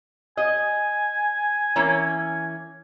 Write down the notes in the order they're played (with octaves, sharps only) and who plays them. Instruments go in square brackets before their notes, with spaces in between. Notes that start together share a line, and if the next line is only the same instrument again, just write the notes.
[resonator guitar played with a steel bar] D#5 [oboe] G#5
[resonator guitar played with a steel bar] E3 A#3 C#4